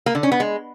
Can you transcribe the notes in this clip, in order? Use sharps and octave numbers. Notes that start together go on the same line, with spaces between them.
A#3
D3
C#4
B3
G#3